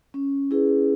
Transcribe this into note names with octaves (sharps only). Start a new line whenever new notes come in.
C#4
E4 G#4 B4